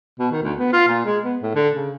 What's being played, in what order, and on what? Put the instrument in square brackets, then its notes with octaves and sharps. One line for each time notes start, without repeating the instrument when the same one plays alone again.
[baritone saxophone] B2
D#3
D2
B3
F4
A#2
G#3
B3
A2
D3
C#3